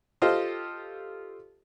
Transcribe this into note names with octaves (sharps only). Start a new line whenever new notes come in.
F4 G4 A4 C5 D#5 F5